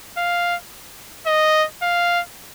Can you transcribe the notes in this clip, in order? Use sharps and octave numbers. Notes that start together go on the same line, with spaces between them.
F5
D#5
F5